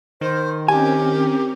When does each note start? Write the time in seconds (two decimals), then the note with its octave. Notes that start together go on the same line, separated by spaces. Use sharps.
0.21 D#3 C5
0.68 C4 C#4 G4 A#4 G#5